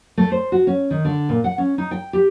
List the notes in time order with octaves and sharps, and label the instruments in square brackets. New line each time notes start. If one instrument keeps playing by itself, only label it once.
[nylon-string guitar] A3
C5
F#4
C#4
D#3
D3
A#2
F#5
C#4
D#4
G5
G4